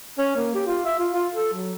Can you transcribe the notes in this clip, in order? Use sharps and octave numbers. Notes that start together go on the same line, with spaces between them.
C#4
A#3
G4
F4
E5
F4
F4
A4
F#3